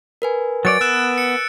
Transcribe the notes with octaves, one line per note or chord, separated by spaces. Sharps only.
A#4 B4 G#5
F#3 C#5 D5 A6 D7
B3 E6 F#6 E7
C#7